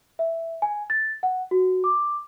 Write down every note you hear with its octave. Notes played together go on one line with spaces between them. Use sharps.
E5
G#5
A6
F#5
F#4
D6